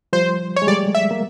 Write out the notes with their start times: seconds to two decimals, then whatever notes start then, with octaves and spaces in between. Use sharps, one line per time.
0.13 F3 G3 C5
0.56 C#5
0.62 G#3
0.67 G3 A3 D5
0.95 E5
1.11 A#3